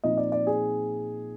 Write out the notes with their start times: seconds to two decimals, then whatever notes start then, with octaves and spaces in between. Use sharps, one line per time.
0.04 A#2 F3 C4 D#4 D#5
0.17 D5
0.32 D5
0.47 G#4